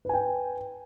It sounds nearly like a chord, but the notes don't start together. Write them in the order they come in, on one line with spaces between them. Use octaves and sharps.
B4 G#5 G5